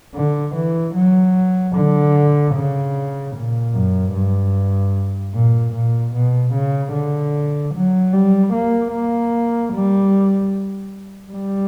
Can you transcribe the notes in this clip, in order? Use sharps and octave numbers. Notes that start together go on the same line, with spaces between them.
D3
E3
F#3
D3
C#3
A#2
F#2
G2
A#2
A#2
B2
C#3
D3
F#3
G3
A#3
A#3
G3
G3